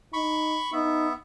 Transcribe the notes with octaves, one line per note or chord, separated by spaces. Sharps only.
D#4 B5 C#6
B3 D#4 E5